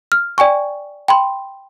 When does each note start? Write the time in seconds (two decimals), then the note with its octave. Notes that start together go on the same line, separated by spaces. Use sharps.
0.12 F6
0.38 D5 G5 G#5 C#6
1.08 G5 B5 C6